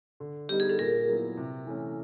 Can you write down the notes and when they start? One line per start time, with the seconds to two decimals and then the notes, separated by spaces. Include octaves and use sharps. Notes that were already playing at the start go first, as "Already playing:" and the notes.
0.20 D3
0.49 G3 B3 D#4 G4
0.60 G#4
0.69 A4
0.79 A#2 G#4 A#4
1.08 F#3 B3 E4
1.37 C3
1.66 E3 A3 C#4